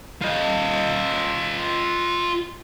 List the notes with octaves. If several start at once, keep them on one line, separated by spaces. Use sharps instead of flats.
F4 D#5